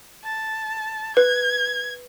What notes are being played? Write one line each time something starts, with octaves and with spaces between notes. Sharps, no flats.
A5
B4 G#6